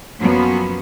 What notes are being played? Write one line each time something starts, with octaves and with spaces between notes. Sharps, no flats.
F#2 F3 F#3 A#3 B3 C#4